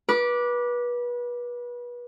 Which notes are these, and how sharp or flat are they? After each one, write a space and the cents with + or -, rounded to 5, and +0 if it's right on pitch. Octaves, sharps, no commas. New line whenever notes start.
B4 -30 D6 +0